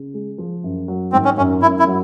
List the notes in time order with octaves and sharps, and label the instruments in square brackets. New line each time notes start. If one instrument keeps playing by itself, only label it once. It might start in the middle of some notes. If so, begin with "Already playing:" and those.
Already playing: [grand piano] C#3
G#3
F3
F#2
F#3
[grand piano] G#1 [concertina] C4
[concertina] C#4
[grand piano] F#2 [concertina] C#4
[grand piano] F#2 [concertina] E4
[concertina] E4
[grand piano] F#3